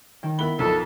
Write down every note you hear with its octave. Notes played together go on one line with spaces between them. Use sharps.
D#3
B3 E4 A#4 B5 G7
B1 F2 D#4 A4